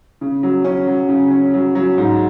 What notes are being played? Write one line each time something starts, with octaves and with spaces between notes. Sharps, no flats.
C#3
F#3
C#4
F#3
C#3
C#4
F#3
F#3
G#2